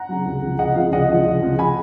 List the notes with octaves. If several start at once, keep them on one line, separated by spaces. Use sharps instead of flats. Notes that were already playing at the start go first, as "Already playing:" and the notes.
Already playing: F#5 A#5
C#3 F#3
C#2
C#3 F3
C#2 D#5 F#5
C#3 F3 F5
C#2 D#5 F#5
C#3 F3
C#2
C#3 F3
G#5 B5